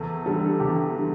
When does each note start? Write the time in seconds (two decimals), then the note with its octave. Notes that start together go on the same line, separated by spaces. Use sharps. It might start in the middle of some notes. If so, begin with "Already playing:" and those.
Already playing: E2 A4
0.26 D3 G3 A4
0.60 E2 G4
0.94 D3 G3